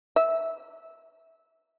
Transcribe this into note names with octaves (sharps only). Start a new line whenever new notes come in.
E5